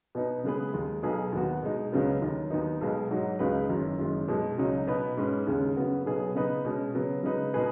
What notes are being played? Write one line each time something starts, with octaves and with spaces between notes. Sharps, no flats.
B2 B3 D#4 B4
C#3 G#3 B3 G#4 B4
D#2 D#3 G#3
B1 B2 B3 G#4
D#2 D#3 B3 F#4
B2 G#3 D#4
C#2 C#3 F#3 B3
D#2 D#3 F#3
D#2 D#3 B3 D#4
B1 B2 G#3 B3
G#2 F#3 D#4 F#4
C#2 C#3 G#3 D#4 B4
F#1 F#2 D#3 F#3
F#1 F#2 D#3 G#3
B2 G#3 D#4
C#2 C#3 F#3 D#4
B2 B3 D#4 B4
G#2 G#3 C#4 B4
D#2 C#3 G#3 C#4
F#2 C#3 B3 F#4
B1 B2 F#3 B3 G#4
C#3 B3 D#4 B4
B2 G#3 C#4
C#3 F#3 B3
C#3 G#3 D#4 B4
B2 G#3 D#4 G#4 B4